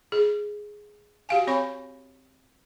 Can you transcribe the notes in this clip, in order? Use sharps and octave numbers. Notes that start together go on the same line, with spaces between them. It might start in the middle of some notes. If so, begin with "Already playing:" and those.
G#4
F#4 G4 F5 G#5
C4 C#5 B5 C#6